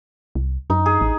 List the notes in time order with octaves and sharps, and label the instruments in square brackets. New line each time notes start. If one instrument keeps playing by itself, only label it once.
[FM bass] C2
[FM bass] F#2 [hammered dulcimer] D#4
[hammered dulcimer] G#4
[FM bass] A1